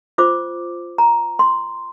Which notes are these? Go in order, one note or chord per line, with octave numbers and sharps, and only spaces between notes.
F4 C5 D6
A#5
C6